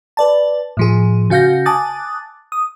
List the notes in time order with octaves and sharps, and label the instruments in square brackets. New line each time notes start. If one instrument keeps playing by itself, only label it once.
[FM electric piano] B4 D5 A5
A2 F3 G#4
C#3 F#4 F5 G6 A#6
G#5 A5 D6 D#6 F#6 A6
D#6